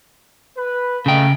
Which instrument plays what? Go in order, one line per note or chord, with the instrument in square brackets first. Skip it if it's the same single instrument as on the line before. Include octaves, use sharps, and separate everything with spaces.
[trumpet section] B4
[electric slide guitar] C#3 G5 [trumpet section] A3 D#5 F5